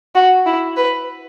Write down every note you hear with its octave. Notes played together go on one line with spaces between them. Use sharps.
F#4
E4
B4